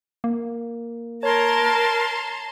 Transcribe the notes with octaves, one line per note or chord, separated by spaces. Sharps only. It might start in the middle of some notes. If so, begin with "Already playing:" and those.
A#3
A#4 C#5 A5 A#5 C6 G#6